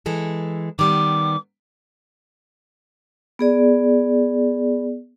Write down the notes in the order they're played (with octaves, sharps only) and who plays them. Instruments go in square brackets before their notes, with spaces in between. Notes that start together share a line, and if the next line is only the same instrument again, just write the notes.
[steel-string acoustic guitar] E3 G#3 A4
[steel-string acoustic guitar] D#3 G3 B3 [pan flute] D6
[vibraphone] B3 G#4 D5